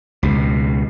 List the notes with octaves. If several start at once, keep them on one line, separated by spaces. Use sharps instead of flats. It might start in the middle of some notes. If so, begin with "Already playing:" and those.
C#2 B2